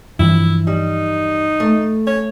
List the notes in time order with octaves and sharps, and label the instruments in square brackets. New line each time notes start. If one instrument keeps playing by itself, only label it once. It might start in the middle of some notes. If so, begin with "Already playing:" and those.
[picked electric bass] G2 E3 F3 [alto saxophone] E4
[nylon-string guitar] G3 [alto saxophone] D#4
[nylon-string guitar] A3
[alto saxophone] C#5